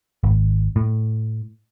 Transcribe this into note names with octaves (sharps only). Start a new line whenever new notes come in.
G#1
A2